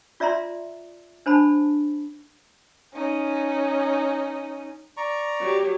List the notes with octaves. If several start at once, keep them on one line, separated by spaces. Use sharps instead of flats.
F4 D5 E5 A#5 C6
D4 C5 A5 B5
C#4 D#4
D5 A#5 C#6
F#3 G4